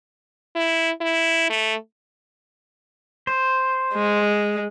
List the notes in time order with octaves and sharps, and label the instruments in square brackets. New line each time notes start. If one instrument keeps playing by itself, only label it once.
[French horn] E4
E4
A3
[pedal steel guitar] C5
[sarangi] G#3